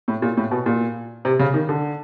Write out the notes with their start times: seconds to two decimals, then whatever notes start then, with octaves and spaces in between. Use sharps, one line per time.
0.08 A2
0.22 A#2
0.37 A2
0.51 B2
0.66 A#2
1.25 C3
1.39 C#3
1.54 D#3
1.69 D3